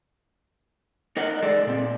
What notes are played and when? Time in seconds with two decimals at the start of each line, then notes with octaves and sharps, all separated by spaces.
1.17 D#4 A#4 D#5 F#5
1.43 G#3 D#4 G#4 A4 D5
1.67 A#2 C4